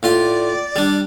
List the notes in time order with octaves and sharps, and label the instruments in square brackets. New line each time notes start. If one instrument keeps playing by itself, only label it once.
[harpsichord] A2 F4 C6 [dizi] D5
[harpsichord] G3 D4